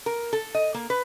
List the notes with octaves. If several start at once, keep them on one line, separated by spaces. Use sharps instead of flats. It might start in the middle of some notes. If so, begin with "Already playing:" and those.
A#4
A4
D#5
A#3
B4